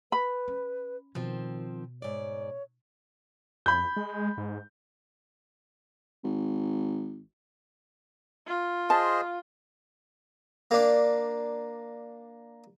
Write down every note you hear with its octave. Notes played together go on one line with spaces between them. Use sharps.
B4 B5
C#4
B2 D#3 F3 C4
G#2 C#5 D5
F2 B5 G6
G#3
G#2
G#1
F4
G#4 C5 D#5 A5
A#3 D4